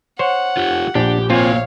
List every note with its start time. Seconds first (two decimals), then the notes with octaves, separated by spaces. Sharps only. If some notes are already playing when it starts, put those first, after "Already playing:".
0.19 C5 C#5 F#5
0.57 F4 G4
0.95 A#1 D4 G4
1.30 A#3 C4 F4 C#5 F5 G#5